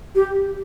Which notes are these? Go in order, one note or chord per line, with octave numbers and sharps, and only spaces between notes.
G4